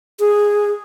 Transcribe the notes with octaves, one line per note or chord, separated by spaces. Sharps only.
G#4